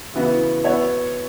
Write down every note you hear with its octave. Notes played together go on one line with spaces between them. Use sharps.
C#3 E3 B3 F#4
B3 F#4 C#5 E5